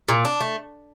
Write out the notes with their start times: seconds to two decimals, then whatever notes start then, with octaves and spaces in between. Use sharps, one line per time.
0.09 A#2
0.25 D4
0.41 A3